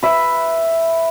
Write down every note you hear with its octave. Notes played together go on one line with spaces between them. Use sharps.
B4 E5